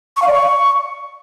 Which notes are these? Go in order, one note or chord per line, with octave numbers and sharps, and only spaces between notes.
C#6
F5
D5
C#6